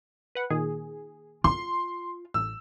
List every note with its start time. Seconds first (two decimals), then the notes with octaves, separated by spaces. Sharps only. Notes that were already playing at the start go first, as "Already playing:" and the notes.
0.35 B4 F#5
0.50 A#2 D#3 G#4
1.44 F4 C6
2.34 A1 E6